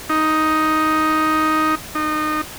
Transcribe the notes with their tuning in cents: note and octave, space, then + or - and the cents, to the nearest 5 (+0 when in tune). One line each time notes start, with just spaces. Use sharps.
D#4 +5
D#4 -25